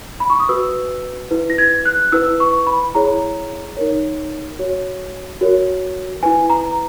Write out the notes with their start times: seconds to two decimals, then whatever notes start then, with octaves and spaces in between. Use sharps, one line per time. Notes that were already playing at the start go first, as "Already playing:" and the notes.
0.20 B5
0.30 C#6
0.40 D#6
0.49 F#4 B4 E6
1.31 E4 B4
1.50 A#6
1.58 G#6
1.85 F#6
2.12 E4 B4 E6
2.40 C#6
2.67 B5
2.95 E4 G#4 C#5 A#5
3.77 D#4 A#4 C#5
4.59 F#4 C#5
5.41 F#4 A#4 C#5
6.23 E4 B4 G#5
6.50 A#5